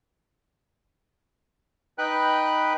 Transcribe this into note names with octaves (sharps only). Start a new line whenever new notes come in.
D#4 B4 G5 B5 F#6